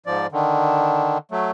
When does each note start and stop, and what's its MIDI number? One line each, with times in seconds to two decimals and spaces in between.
0.06 0.27 44
0.06 0.27 53
0.06 0.27 74
0.32 1.18 50
0.32 1.18 51
1.31 1.51 54
1.31 1.51 57